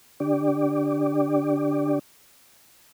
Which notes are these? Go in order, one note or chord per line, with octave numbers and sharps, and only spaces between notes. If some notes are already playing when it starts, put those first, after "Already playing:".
D3 D4 G4 D5